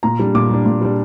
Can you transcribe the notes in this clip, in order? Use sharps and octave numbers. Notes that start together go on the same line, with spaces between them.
A#2 A#5
G3 D4
A#2 D6
G3 D4
A#2
G3 D4